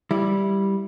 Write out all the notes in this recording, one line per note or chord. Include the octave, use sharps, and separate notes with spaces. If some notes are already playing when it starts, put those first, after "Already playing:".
G3 E4